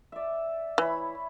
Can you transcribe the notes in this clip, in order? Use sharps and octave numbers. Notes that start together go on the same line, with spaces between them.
D5 E5
E3 E4 C#5 B5